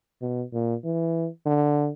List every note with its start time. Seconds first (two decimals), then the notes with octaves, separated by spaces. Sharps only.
0.22 B2
0.53 A#2
0.84 E3
1.46 D3